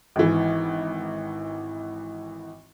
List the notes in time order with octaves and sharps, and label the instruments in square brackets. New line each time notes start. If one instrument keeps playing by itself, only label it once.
[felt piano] G#1 E3